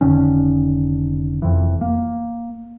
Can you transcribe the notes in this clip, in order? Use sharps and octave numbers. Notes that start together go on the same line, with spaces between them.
F1 D3 D#3 C#4
F1 F2 E3
A#3